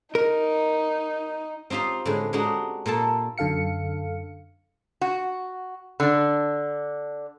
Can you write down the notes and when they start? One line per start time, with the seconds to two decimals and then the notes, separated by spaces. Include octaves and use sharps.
0.15 D#4 A#4
1.70 C4 D#4 F4 G4 C5
2.05 A2 D3 G#3
2.33 G#3 D4 D#4 F#4 G4
2.86 A#2 A#3 A4 A5
3.38 F#2 D3 A4 F5 C#7
5.01 F#4
6.00 D3 D4